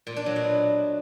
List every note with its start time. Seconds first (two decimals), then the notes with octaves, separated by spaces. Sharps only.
0.07 A#2
0.16 D4
0.26 F#3
0.36 B2